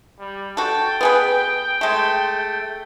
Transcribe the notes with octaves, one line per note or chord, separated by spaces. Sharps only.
G3
F#4 A4 G5
B3 G#4 B4
G#3 A3